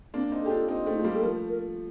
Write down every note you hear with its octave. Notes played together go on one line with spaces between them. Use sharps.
A#3 C4 D4
C4 D#4
G4 A4
D4 F4
C4 D#4
A3 C4
D#4
A3 F4
G3 A#3 G4
A4
F3 A3 A#4
A#4